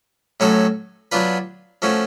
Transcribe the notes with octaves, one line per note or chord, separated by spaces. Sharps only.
A2 F#3 C#4 F#4 A4
F#3 B3 D4 F4 B4
F3 A3 C#4 F#4